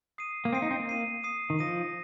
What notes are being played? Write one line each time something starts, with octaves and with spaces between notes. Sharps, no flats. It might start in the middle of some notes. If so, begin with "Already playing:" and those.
D#6 C7 D#7
A#3
C4 D#6 C7 D#7
D#4
C4
A#3
D#6 C7 D#7
D#6 C7 D#7
D#3
F3 D#6 A#6 D#7